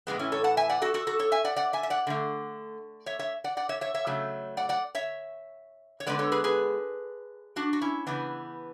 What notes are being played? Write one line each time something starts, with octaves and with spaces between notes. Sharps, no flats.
A2 E3 G#3 B3
C#4 E4
A4 C#5
F#5 A5
E5 G#5
D5 F#5
F#4 A4
F#4 A4
F#4 A4
A4 C#5
E5 G#5
D5 F#5
D5 F#5
E5 G#5
E5
D5 F#5
D3 A3
C#5 E5
C#5 E5
D5 F#5
D5 F#5
C#5 E5
C#5 E5
C#5 E5
C#3 F#3 A3
D5 F#5
D5 F#5
C#5 E5
C#5
D3 G#3 B3 B4 D5
A4 C#5
G#4 B4
G#4 B4
D4 F#4
F#4
C#4 E4
C#3 E3 B3 D4